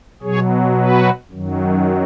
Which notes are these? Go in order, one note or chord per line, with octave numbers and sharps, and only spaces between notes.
B2 F#3 G#4 C#5
F#4 B4
F#2 D#3 F#3